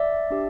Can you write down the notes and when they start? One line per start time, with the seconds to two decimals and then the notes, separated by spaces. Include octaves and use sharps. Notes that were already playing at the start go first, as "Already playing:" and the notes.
Already playing: D5 E5
0.30 D4 G4